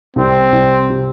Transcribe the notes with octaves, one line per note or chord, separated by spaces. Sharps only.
C2 C4
C2
C3